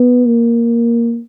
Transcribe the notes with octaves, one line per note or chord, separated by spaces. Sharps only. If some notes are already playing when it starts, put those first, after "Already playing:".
Already playing: B3
A#3